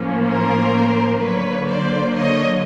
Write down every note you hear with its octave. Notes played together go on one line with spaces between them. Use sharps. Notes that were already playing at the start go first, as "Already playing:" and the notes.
Already playing: A2 F3 A#3 C#4
A#4 C5
D3 F#3 A#3 B4 C#5
C5 D5
C#5 D#5